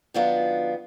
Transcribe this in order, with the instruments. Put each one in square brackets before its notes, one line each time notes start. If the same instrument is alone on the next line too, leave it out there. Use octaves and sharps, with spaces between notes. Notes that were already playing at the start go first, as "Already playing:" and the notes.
[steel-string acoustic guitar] D#3 F#3 B3 D4 F4